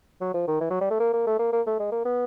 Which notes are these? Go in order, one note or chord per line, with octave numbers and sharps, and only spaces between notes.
F#3
F3
D#3
E3
F#3
G3
A3
A#3
A#3
A3
A#3
A#3
A3
G#3
A#3
B3